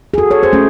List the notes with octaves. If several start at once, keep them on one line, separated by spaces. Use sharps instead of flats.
G#4
F#4 A4
A4 C#5
G#4 C5
A3 C#4